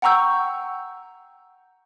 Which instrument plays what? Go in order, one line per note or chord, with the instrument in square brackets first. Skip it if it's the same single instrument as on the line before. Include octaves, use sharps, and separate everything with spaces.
[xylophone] F#5 G5 A#5 C#6 E6 G6